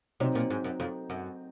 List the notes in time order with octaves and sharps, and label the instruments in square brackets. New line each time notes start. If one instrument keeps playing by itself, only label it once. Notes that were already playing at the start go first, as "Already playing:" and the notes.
[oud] C3 [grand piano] F#3 C4 D#4
[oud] A#2
G#2
F#2
F2
F#2